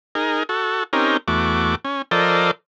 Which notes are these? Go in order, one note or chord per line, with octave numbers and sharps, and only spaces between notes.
D#4 G#4 A#4
F#4 A4
C4 C#4 D#4 G4 A#4
E2 A3 F#4 D6
C#4
F3 A4 A#4 C5 D5 D#5